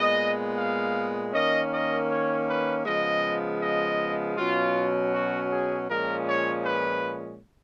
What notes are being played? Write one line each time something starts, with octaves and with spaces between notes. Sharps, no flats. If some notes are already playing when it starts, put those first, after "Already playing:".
Already playing: A#2 G#3 B3 D#5
F5
D#3 A#3 C#4 D#5
D#5
C#5
B4
C#3 F3 G#3 B3 D#5
D#5
B2 F#3 C#4 F4
F#4
G#4
A#2 F3 G#3 C#4 A#4
C#5
B4